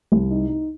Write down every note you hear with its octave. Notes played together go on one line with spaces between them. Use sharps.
C2
D#4
D#4